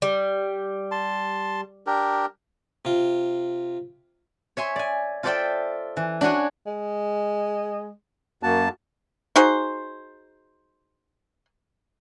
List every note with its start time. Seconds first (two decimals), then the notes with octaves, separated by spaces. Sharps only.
0.02 G3
0.91 A5 C6
1.87 D4 G4 A#4
2.85 C3 F4
4.57 C#5 E5 G#5 C6
4.76 D5 G#5
5.23 F4 A4 C5 D5 E5 G5
5.97 E3
6.21 D4 F#4 C#5 G#5
6.67 G#3
8.43 F#2 A#3 F#4 A5
9.36 D#4 F#4 G#4 C5